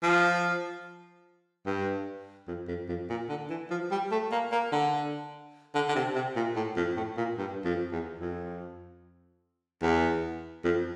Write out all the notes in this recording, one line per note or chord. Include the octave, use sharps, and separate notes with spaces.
F3
G2
F2
F2
F2
A#2
D3
E3
F3
G3
A3
A#3
A#3
D3
D3
D3
C3
C3
A#2
A2
F2
A2
A#2
G2
F2
E2
F2
E2
F2